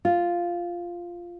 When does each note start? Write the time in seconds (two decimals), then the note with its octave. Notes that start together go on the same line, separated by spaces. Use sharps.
0.05 F4